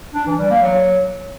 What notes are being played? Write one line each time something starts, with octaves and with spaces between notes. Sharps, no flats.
D4
E3
G3
A#3
F#3